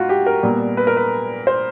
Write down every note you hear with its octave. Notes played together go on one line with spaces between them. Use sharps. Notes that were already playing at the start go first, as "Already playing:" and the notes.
Already playing: G#2 F4 F#4
G4
A#4
A#2 G3 B3
B4
A#4
B4
C5